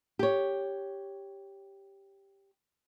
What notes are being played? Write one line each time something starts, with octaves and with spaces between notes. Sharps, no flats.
G4 C#5